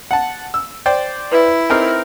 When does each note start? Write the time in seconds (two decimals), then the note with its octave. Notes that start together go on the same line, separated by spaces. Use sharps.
0.11 F#5 A5
0.54 E6
0.86 C5 D5 G5
1.32 E4 B4
1.70 C4 D#4 G#4 A#4